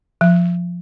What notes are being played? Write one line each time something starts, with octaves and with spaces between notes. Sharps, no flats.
F3